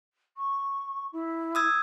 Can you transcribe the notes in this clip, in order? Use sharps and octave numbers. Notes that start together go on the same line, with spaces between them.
C#6
E4
D#6 E6 G#6